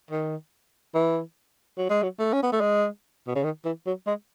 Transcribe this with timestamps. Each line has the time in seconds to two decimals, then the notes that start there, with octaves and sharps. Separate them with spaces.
0.11 D#3
0.94 E3
1.78 F#3
1.90 G#3
2.03 F#3
2.19 A3
2.33 C#4
2.43 B3
2.52 A3
2.61 G#3
3.27 B2
3.35 C#3
3.44 D#3
3.65 E3
3.87 F#3
4.07 G#3